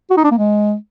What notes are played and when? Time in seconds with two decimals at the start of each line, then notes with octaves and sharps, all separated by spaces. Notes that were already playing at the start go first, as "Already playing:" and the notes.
0.10 F#4
0.17 D#4
0.24 D4
0.31 A#3
0.38 G#3